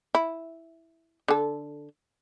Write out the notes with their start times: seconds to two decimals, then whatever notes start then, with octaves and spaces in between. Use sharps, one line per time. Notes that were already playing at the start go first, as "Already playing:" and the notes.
0.15 E4
1.28 D3 A4